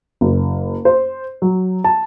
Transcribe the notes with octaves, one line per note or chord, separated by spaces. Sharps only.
F#1
C5
F#3
A5